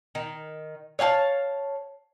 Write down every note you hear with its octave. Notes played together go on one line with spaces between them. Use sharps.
D#3
C#5 F5 G5 A5